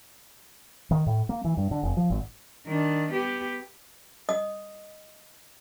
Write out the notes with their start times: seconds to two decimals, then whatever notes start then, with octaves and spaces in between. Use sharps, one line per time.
0.91 D#3
1.06 A2
1.29 A#3
1.45 E3
1.57 G2
1.71 D3
1.83 F1
1.97 F3
2.10 G#1
2.67 D#3 D4
3.11 B3 G4
4.29 D#5 D#6